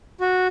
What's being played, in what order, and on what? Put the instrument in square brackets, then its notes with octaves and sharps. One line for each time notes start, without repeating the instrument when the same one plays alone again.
[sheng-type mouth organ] F#4